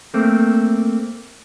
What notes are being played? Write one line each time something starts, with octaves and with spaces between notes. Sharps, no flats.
A3 A#3 C4